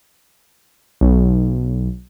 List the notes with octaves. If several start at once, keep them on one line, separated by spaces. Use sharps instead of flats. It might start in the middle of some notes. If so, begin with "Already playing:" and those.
B1